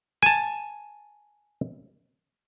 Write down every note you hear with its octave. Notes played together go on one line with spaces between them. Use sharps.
G#5 A5